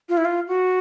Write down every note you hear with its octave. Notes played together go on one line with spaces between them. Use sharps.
F4
E4
F4
F#4